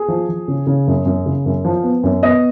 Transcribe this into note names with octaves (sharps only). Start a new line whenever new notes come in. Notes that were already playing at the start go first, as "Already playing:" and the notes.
Already playing: G#4
F3
F3
C#3
C#3
F#2
F#2
C#3
F#2
F3
B3
F#2
B3 D#5